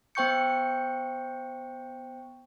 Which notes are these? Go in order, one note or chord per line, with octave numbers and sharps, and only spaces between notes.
B3 C5 G5 C#6 G6 C#7